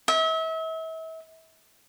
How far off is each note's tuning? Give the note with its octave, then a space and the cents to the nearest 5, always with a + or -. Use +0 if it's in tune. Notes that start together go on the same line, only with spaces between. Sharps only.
E5 -35